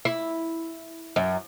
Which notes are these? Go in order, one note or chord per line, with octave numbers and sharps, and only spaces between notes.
E4
F#2